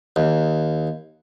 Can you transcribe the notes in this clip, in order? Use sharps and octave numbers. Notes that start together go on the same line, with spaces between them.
D#2